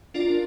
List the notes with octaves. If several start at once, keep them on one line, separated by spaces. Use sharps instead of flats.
D4 F4 A#4 D5